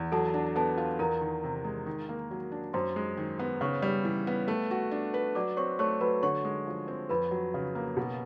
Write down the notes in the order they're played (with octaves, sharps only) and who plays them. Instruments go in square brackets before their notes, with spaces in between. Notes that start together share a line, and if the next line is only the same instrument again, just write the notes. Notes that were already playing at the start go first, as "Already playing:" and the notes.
Already playing: [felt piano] E2
[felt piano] F#3 [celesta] A4 A5
[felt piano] D4
[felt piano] B3 [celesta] A4 A5
[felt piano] F4
[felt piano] E2 [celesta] A#4 A#5
[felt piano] D#3
C3
G#3
D#3
A#3
F#3
D4
[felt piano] F#2 [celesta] C5 C6
[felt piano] G#3
D#3
B3
[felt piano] C#3 [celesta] C#5 C#6
[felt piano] G3
E3
B3
A3
F#4
D4
B4
[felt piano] F#3 [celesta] D5 D6
[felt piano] C4 [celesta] C#5 C#6
[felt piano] A3 [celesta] C#5 C#6
[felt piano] F#3 [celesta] B4 B5
[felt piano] D3 [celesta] C#5 C#6
[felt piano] G#3
F3
C4
[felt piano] F2 [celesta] B4 B5
[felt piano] F#3
C#3
A#3
B2